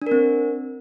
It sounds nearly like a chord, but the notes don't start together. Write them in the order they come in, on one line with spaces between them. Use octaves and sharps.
D4 A#4 C4